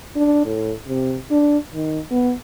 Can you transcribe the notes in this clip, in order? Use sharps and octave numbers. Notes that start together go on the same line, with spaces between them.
D4
A2
C3
D4
D#3
B3